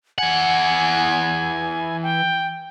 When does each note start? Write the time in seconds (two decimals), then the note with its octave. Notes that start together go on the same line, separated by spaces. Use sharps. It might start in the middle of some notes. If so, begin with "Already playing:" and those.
0.18 E3 F#5 G#5
2.03 G5